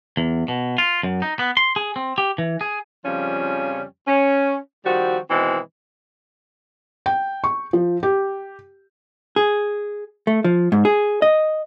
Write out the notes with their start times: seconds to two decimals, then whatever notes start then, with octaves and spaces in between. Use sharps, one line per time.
0.17 E2
0.48 B2
0.78 F4
1.03 F#2
1.22 D#4
1.39 B3
1.57 C6
1.76 G#4
1.96 C4
2.18 G4
2.38 E3
2.61 G#4
3.05 F2 C#3 F3 G3 C#4
4.08 C#4
4.86 D#3 F3 G3 C4 F#4
5.30 B2 D#3 E3 G#3 C4
7.06 G5
7.44 C#6
7.73 F3
8.03 G4
9.36 G#4
10.27 A3
10.44 F3
10.72 G#2
10.85 G#4
11.22 D#5